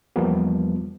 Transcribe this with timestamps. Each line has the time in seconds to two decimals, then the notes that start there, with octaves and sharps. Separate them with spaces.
0.16 E2 F3 G3 A#3 B3